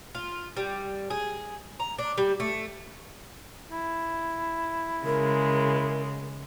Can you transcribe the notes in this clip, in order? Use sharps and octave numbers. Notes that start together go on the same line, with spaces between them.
F4
G3
G#4
A#5
D4
G3
A3
E4
C#3 G#3 A#4